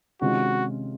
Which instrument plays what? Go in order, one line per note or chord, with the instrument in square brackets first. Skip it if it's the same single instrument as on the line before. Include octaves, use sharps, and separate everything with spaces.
[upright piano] C3 D#3 G#3 C#4 F4 [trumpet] F#4